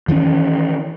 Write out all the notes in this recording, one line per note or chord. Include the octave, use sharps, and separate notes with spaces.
D#3 E3 G3 C#4